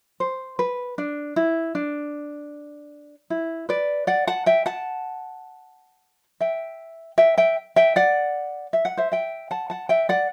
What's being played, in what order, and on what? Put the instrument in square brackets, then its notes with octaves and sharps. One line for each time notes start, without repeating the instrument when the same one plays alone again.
[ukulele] C5
B4
D4
E4
D4
E4
B4 D5
D5 F#5
F#5 A5
E5 G5
F#5 A5
E5 G5
E5 G5
E5 G5
E5 G5
D5 F#5
E5
F#5
C5 E5
E5 G5
F#5 A5
F#5 A5
E5 G5
D5 F#5